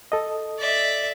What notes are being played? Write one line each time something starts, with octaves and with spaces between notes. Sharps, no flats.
A4 D#5
D5 E5